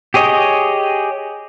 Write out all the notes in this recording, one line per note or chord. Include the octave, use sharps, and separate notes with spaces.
G4 G#4 C#5 D#5